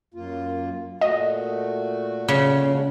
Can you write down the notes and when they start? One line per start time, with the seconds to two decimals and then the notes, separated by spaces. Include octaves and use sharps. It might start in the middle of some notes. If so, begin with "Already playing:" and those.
0.14 F#2 A#3 F4
1.01 A#2 A3 F#4 D#5
2.28 C#3
2.70 G#3 D4